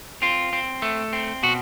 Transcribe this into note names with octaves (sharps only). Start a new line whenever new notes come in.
C4 F4
C4
A3
C4
B2 F#4